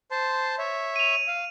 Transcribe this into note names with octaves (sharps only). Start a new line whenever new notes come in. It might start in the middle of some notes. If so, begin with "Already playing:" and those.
C5 A5 C6
C#5 E5
D#7 F7
F5